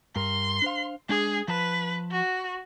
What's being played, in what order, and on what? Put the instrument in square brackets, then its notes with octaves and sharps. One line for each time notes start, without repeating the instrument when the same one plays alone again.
[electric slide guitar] G2 A#4 [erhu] C6
[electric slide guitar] D4 C5 F5
[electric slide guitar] G#3 D4 [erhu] G#4
[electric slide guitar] F3 A5 [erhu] B4
[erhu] F#4